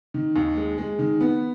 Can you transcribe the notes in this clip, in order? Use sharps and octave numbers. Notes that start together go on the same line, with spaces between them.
D#3
D#2
G#3
G#3
D#3
B3